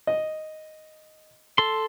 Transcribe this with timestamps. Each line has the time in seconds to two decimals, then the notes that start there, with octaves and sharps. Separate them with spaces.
0.07 D#5
1.58 A4 C6